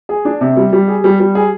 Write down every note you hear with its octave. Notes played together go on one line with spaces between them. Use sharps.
G#4
D4
C3
G3
G3
G#4
G3
G3
G#4